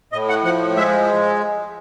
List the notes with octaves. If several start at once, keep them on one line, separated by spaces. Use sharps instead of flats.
A2 D#5
F#5
F3 F#5
G#3 E5